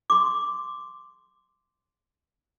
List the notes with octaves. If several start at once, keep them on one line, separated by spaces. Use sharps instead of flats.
C6 D6